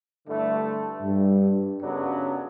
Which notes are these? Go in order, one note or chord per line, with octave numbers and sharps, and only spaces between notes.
G2 D3 A3 E4
G2
F#2 C#3 F#3 B3 D4